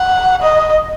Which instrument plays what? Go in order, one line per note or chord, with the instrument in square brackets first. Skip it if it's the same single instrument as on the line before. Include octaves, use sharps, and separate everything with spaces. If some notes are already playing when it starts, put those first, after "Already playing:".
Already playing: [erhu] F#5
D#5